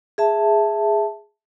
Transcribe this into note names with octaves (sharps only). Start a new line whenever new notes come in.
G#4 E5 A5